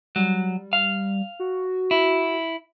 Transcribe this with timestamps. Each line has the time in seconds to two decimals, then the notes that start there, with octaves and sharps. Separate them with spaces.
0.16 F#3 G3
0.73 F5
1.40 F#4
1.91 E4